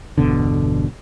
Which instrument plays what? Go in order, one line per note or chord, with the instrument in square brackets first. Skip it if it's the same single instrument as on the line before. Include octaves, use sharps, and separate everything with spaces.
[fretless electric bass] G1 E2 B2 D3